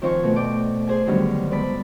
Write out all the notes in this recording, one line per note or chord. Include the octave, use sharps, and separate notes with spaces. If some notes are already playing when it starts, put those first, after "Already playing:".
D#3 F3 C4 C5 G#5 C#6
B2 A3
D5 G5 D6
G#4 C5 G#5
D3 D#3 F#3 G3 B3 D4
G#2 B3 D5 A5 B5